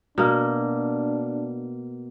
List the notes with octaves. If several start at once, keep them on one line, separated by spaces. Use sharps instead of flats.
B2 A#3 D4